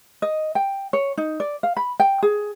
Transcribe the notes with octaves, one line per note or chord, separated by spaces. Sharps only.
D#5
G5
C#5
D#4
D5
F5
B5
G5
G#4